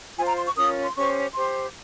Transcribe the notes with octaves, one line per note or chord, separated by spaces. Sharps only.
F4 C5 G#5
A#5
C6
C#6
C#4 F4 A#4 D#6
C6
C#4 G4 C5 C#6
G4 C5 C6